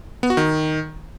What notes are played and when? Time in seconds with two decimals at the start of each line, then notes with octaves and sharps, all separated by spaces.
0.23 B3
0.30 F#4
0.37 D#3